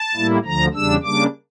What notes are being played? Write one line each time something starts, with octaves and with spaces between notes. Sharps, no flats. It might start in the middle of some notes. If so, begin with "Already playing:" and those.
Already playing: A5
A2 G3 A#3 E4
D2 D3 F3 A#5
E2 C#3 G3 D4 E6
C#3 G3 A#3 D4 D6